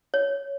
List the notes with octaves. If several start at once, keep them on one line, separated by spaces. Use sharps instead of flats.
C#5